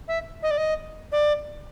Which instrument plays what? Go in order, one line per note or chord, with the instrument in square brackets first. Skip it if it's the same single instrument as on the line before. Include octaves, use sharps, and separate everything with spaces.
[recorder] E5
D#5
D5
D#5
D5